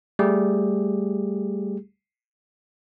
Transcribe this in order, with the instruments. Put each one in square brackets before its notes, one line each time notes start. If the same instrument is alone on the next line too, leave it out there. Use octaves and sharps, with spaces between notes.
[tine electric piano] G3 A3 G4 G#4